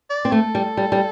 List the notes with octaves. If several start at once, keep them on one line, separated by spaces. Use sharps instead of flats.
D5
C4
A3 A4
G3
G3
G3